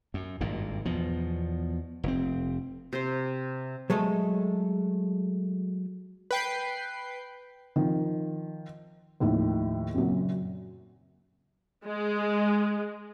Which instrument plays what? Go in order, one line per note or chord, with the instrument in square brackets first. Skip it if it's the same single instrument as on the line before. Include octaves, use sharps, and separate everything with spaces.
[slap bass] F#2
G#1 G2 A#2
E2 B2 F3
F1 C4
[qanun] C3 C5
[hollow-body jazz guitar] F#3 G#3 A3 A4 D#5
[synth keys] B4 G5 C7
[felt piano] D#3 F3
D#2 A2 D#3 F3
F#2 A#2 C#3 F#3
[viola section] G#3